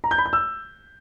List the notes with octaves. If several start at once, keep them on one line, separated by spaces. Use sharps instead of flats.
A#5
G6
B5
G6
E6